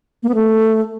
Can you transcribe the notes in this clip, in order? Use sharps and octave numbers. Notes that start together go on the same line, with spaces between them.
A#3
B3
A3